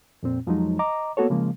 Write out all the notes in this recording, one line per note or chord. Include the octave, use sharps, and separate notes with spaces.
F2 A#2 C4
F2 F3 F#3 G#3 D#4
D#5 A#5 D6
A#3 B3 F#4 A4 C#5
C#3 F3 G#3 A#3